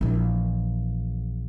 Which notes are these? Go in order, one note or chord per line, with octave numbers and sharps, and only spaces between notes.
A#1 E3